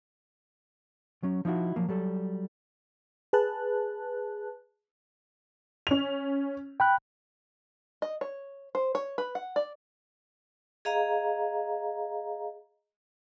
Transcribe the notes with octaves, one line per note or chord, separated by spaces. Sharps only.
F#3 C#4
F3 D#4 E4 F#4
F3 F#3 A#3
F#3 G3 A4
G#4 B4 A5 F#6
C#4 F7
G5 B5 F#6
D#5
C#5
C5
C#5
B4
F#5
D5
G#4 D#5 F5 A#5